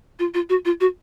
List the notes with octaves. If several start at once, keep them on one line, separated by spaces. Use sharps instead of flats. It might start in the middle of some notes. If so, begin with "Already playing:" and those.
F4
F4
F#4
F4
F#4